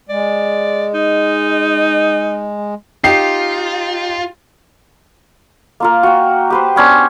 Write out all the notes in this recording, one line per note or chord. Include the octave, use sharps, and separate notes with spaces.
G#3 D5
D#4
D#4 F4 G4 C7
A#3 F4 A#4
F#4 G5
G4 B4 C5
B3 C#4 D4 C5